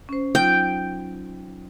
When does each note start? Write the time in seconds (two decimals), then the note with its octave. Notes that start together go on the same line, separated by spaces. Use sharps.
0.09 C#4 C5
0.35 F#3 D#4 F4 G5